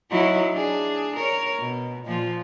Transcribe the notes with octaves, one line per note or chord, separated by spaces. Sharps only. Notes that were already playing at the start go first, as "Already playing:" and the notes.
F#3 D#4 E4
D4 G#4
A#4 C#5
B2
A#2 F3 F4